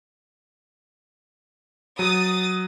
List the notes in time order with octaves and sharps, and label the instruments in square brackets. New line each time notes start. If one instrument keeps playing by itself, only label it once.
[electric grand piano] F#3 [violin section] D#6 A6